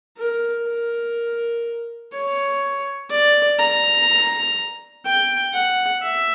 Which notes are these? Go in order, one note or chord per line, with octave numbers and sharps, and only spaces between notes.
A#4
A#4
C#5
D5
A#5
G5
F#5
E5